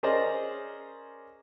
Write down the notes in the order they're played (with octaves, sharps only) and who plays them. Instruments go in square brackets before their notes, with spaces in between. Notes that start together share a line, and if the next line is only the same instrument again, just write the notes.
[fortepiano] C#4 G#4 A#4 C5 D5 D#5